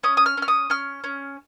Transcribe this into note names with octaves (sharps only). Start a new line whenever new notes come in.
C#4 D#6
D#6
F6
C#4 F6
D#6
C#4 F6
C#4